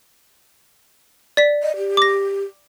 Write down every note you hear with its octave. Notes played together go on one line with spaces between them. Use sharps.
D5 B6
D#5
G4
D6 A#6